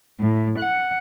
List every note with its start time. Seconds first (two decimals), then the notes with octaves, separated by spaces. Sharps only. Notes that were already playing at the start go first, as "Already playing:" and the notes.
0.20 A2
0.59 F#5